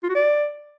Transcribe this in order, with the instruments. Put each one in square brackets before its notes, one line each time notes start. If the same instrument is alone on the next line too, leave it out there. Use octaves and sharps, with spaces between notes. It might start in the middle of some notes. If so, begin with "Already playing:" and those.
[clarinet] F4
F#4
D5